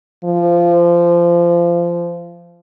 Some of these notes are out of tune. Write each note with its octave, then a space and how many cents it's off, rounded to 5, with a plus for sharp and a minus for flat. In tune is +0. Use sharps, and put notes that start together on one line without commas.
F3 -20